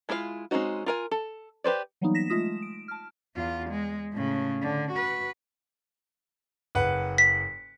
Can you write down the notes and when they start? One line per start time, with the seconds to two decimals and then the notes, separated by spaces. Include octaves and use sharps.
0.09 G#3 E4 F4 A4 F5
0.51 G#3 C4 C#4 D#4 F#4
0.86 F4 A#4 G#5
1.11 A4
1.64 G4 B4 C5 D5
2.01 E3 F#3 G3 A#3 B3 D#4
2.15 A#6 B6 E7
2.30 G#3 A3 F4 D#6 E7
2.62 D7
2.88 A5 F6
3.36 E2 F4
3.70 G#3
4.12 A2 C#3
4.62 D3
4.92 F#4 B4
6.75 F#1 B4 F#5
7.18 B6